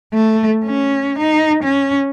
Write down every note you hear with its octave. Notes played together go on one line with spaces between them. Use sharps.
A3
C#4
D#4
C#4